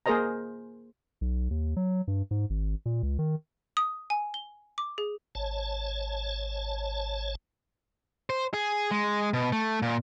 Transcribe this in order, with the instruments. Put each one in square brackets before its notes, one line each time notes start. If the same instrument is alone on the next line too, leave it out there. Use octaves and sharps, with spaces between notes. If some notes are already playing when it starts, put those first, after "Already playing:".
[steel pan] A#3 G#4 A#4 C5 D#5 A#5
[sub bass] B1
D#2
F#3
G2
G#2
G#1
A#2
C#2
D#3
[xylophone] D#6
G#5
G7
D6
G#4
[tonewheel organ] G#1 C#5 A5
[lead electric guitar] C5
G#4
G#3
B2
A3
A#2